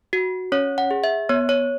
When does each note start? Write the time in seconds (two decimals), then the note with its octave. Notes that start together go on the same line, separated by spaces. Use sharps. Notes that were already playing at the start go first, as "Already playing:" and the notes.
0.13 F#4
0.52 C#4 C#5
0.78 F#5
0.91 G#4
1.04 E5
1.29 B3 C#5
1.49 C#5